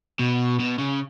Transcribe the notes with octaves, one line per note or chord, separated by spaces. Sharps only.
B2
B2
C#3